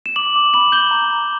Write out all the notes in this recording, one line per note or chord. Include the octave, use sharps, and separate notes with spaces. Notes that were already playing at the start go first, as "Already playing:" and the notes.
E7
D6 F#7
D6
B5 F#7
G6 G7
A#5
A#5